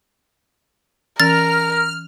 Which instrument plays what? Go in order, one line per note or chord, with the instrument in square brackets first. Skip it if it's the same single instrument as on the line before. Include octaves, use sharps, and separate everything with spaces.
[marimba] E3 C#4 [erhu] A#4 [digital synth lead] F6 [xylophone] A6